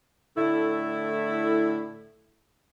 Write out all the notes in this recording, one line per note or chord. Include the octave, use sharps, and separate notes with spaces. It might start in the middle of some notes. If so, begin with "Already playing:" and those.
A2 D3 A3 E4